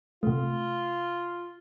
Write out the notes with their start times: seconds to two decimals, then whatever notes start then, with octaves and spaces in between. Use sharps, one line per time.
0.23 C3 A3 F4